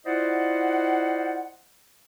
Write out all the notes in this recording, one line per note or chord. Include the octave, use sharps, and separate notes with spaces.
E4 F4 C5 D5 D#5 F#5